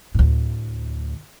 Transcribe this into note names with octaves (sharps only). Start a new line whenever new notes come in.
D2 A2